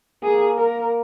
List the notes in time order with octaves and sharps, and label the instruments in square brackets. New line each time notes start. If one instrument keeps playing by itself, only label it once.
[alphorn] A#3 [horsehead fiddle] G#4
[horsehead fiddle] A#4